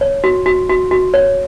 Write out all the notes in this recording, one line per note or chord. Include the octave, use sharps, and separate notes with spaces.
C#5
F#4
F#4
F#4
F#4
C#5